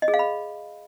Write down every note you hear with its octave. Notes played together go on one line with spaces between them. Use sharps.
D#5
G#4
F5
B5